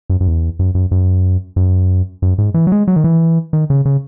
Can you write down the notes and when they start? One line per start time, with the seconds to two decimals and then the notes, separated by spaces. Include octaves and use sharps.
0.10 F#2
0.20 F#2
0.27 E2
0.59 F#2
0.75 F#2
0.91 F#2
1.56 F#2
2.22 F#2
2.38 G#2
2.54 E3
2.67 F#3
2.72 G#3
2.88 F#3
2.96 D#3
3.04 E3
3.53 D#3
3.70 C#3
3.85 C#3